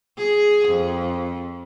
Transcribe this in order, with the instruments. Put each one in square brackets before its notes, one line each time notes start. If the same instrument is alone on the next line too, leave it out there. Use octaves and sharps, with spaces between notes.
[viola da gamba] G#4
F2